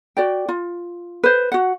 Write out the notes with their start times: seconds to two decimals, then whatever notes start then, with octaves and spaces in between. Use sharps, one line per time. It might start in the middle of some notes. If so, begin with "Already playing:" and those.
0.17 F#4 D5 G5
0.48 F4
1.23 B4 C5
1.52 F#4 F#5